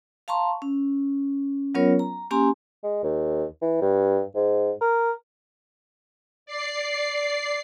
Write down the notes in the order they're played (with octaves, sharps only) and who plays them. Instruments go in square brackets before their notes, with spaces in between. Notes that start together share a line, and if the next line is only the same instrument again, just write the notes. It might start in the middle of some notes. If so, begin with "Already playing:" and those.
[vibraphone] F5 A5 A#5 C6 C#6
C#4
F#3 B3 C#4 F4 A#4 C#5
A#5
A#3 C#4 G4 G#5 A#5 C6
[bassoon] G#3
D#2
E3
G2
G#2
A#4
[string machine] D5 C7